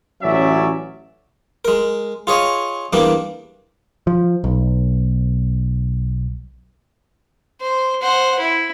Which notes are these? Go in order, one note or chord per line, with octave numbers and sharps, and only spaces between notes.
A1 F#3 C#4 D5 E5
G#3 A#4
F4 G#4 C#5 D#5
E2 G3 A#3 D4
F3
B1
C5
C5 F#5
E4